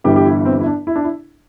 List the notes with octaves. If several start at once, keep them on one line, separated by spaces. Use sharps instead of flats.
G1 G2 E3 G3 G4
G4
E4
C4
E4
D4
E4
D4
E4